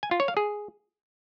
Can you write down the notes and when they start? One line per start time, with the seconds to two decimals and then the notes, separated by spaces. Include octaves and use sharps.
0.03 G#5
0.11 F4
0.20 C#5
0.28 F5
0.37 G#4